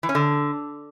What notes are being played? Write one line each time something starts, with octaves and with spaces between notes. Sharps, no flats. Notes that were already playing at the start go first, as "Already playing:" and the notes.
E3
C#4
D3